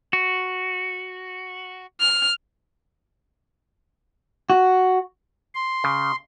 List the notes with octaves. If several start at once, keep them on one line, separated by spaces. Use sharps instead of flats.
F#4
F6
F#4
C6
C#3